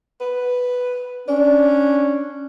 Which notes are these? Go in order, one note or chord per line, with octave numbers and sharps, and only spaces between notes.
B4
C#4 D4